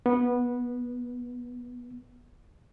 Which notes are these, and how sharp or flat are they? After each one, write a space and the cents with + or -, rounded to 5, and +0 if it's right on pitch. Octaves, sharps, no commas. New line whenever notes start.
B3 -15